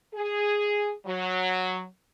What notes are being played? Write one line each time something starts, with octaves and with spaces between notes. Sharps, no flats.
G#4
F#3